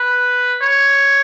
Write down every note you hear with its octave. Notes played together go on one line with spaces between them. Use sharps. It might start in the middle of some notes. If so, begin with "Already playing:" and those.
Already playing: B4
C#5